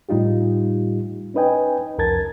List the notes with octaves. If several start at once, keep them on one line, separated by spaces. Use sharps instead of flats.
A2 G3 D#4 F4 G4
C#4 D#4 B4 D#5 G5 G#5
C2 F2 A#4 A5 G#6 A6